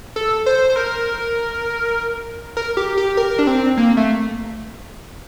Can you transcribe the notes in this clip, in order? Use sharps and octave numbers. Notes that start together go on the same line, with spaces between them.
A4
C5
C5
A#4
A#4
G4
G4
A#4
D4
C4
A#3
A3